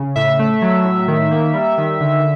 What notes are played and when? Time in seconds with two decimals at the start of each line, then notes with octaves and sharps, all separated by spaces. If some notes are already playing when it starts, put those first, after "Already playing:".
Already playing: C#3
0.16 A2 E5
0.39 A3
0.62 F#3
0.85 A2
1.08 D#3
1.31 A#3
1.53 G3
1.78 D#3
2.00 D3